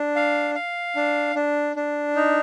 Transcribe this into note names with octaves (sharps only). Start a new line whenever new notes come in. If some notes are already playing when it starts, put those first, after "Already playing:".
Already playing: D4
F5
F5
D4
D4
D4
D#4